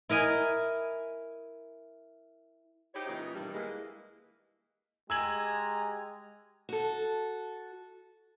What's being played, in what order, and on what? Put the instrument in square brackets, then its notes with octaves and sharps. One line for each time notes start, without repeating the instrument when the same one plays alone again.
[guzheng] E4 A#4 D#5 G#5
[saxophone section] D#4 E4 F#4 G4 C5 C#5
A#2 C#3 E3 G#3 D#4
G2 B2 D#3 E3 G3
E3 G#3 A#3
[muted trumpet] G#3 [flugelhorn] G4 [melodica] G#5 A#5 [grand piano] E6 G#6 F#7
[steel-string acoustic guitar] F#4 A4